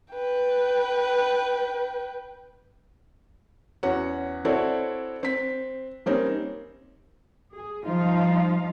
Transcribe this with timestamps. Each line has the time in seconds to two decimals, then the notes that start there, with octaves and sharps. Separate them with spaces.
0.14 B4 G5
3.83 E2 C#4 F#4 F#5
4.45 C4 E4 F#4 A4 C#5 D5
5.23 C4 B6
6.06 G3 A#3 C4 C#4 D#4
7.53 G#4
7.84 F3 G3 D#4 F4 F5